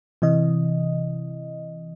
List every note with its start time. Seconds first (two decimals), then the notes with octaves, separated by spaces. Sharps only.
0.22 C3 E3 D#5